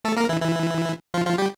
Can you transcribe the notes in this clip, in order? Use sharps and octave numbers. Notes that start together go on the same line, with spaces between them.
A3 A4
A#3 A#4
E3 E4
E3 E4
F3 F4
F3 F4
G3 G4